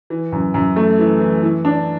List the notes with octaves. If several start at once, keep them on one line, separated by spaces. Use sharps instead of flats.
E3
F#2
F#2
A3
E3
E3
E3
D4